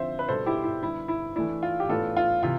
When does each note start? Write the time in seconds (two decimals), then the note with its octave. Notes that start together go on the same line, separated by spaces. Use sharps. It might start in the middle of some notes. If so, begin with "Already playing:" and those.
Already playing: D3 F3 C4 C5 E5
0.19 B4
0.29 B2 G3 D4 A4 C5
0.46 E4 G4
0.64 E4
0.83 D3 G3 B3 E4
1.08 E4
1.35 E3 A3 D4 E4
1.63 F4
1.80 G4
1.89 A2 E3 B3 D4 F4 A4
2.17 F4
2.43 C3 E3 F4